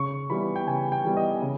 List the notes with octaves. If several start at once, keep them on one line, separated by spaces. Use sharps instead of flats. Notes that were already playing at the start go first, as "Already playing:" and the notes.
Already playing: C#3 C#6
E3 G3 B3 B5
G5
C#3 G#5
G5
E3 G3 B3
D#5
C#3